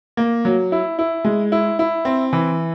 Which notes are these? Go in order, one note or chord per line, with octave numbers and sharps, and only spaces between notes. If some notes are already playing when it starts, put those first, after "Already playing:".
A#3
F#3
E4
E4
G#3
E4
E4
C4
E3